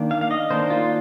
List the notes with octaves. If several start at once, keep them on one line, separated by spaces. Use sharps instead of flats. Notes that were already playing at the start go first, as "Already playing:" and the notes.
Already playing: D#3 A#3 D4
F5
F5
D#5
D#3 A#3 D4 C5
F4